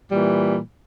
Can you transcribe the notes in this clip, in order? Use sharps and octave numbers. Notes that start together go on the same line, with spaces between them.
A#2 E3 G3